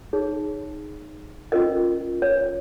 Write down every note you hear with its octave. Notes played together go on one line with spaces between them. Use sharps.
D#4 G#4 C#5
C#4 F4 A#4 D#5
C#5